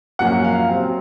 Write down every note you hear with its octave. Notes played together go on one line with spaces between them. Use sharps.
F#2 F3 A#3 C#4 F#5
F5
C3 F#3 C4